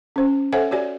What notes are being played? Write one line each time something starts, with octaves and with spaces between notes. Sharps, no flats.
C#4 C5
A4 C5 C#5 E5 F#5 G#5
F#4 G4 C#5 D5 G#5